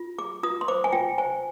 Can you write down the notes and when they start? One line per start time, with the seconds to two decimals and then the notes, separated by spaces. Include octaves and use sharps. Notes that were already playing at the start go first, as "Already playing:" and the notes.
Already playing: F4
0.19 G#4 D6
0.43 F4 D#6
0.61 C6
0.68 C5 D6
0.84 G#5
0.92 F4 G5
1.18 C5 G#5